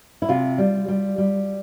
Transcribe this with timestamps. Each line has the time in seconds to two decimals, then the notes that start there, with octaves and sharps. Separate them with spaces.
0.22 E4
0.28 C3 F4
0.58 G3
0.88 G3
1.18 G3